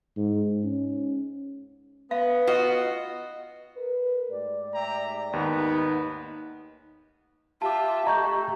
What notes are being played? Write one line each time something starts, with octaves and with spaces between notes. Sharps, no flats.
G#2
C#4
B3 F5
F4 F#4 D#5
A#4 B4
G#2 A3 G4 D5
E5 G5 A#5
D#2 B3 D#4
F4 G4 E5 A5 D6
A3 D#5 A#5 C#6 G6